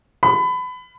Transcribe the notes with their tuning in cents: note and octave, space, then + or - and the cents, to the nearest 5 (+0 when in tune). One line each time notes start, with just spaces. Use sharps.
B5 +25